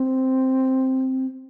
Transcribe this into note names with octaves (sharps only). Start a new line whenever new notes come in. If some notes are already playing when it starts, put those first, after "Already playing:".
Already playing: C4